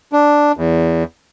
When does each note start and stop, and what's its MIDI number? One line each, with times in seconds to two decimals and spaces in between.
0.13 0.52 62
0.57 1.04 40